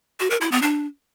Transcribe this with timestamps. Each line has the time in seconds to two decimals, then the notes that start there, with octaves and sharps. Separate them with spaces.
0.20 F#4
0.30 A#4
0.41 E4
0.52 B3
0.62 D4